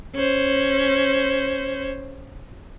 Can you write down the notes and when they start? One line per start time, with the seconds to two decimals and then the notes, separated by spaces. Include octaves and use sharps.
0.15 C#4 C5